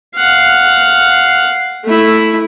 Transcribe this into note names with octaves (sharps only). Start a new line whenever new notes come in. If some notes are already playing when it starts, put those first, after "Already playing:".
F5 F#5
A3 E4